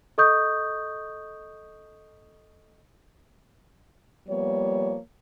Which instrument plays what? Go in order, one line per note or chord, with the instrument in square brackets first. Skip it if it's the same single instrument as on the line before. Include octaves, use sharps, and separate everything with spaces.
[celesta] A4 D#5 C#6 D#6 G6
[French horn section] F3 G3 A#3 B3 C#5